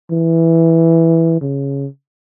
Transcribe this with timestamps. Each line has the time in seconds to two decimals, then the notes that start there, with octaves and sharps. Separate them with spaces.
0.11 E3
1.41 C#3